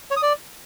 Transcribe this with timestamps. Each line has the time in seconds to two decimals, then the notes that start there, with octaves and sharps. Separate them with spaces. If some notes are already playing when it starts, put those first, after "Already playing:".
0.11 C#5
0.17 D#6
0.22 D5